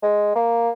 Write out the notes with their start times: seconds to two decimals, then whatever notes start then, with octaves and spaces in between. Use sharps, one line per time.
0.03 G#3
0.35 A#3